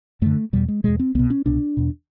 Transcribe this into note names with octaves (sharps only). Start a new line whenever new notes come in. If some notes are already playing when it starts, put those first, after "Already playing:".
F#2 D3 A3
E2 B2 G3
G#3
E2 B2 G#3
C4
C2 B2 B3
C#4
C2 B2 D4
E2 B2